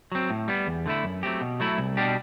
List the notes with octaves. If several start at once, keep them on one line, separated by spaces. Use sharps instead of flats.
F#3 C4
A2
G3 B3
E2
D3 A3 E4
F#2
F#3 A3 C4 G4
B2
F#3 A3 E4
C2
B2 G3 D4 G4